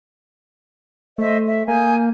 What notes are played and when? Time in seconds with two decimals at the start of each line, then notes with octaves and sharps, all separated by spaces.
1.18 A3 C5 D#5 E5
1.45 E5
1.68 A#3 G#5 D#6 G6